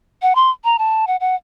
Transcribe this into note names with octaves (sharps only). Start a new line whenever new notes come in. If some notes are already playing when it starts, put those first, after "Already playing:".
F#5
C6
A#5
A5
F#5
F#5